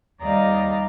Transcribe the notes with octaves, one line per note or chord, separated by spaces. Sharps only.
D#2 G3 D5 D#5 F5 A#5